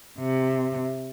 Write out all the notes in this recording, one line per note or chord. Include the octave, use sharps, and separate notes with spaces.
C3